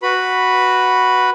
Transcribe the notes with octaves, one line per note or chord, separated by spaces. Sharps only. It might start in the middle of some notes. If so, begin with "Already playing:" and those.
F#4 B4 B5